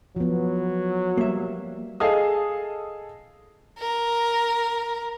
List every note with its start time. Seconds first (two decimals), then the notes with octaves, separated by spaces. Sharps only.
0.16 F3 F#3 B3
1.18 G3 A#3 E5
2.00 G#4 A4 D#5 F5 D#6
3.78 A#4